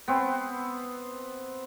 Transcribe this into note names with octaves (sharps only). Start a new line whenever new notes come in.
B3 C4